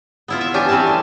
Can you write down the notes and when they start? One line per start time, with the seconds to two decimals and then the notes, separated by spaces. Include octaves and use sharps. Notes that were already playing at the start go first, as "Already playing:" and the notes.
0.28 B3 E4 F4
0.41 E5
0.54 E3 C#4 D4 G4 G#5
0.69 E3 G3 C4 G#5 A5
0.88 A2